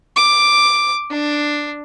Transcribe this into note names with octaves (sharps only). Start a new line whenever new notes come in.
D6
D4